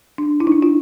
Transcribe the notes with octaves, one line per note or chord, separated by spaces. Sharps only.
D4
D4 E4
D#4
D4
D#4 F4